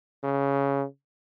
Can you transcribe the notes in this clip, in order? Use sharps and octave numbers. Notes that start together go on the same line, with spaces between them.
C#3